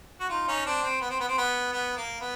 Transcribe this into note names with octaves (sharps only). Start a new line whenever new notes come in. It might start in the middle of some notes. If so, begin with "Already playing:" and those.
F#4
D#4 F4
C#4 D#4
C4 D4
C4
B3
C4
B3
C4
B3
B3
A#3
B3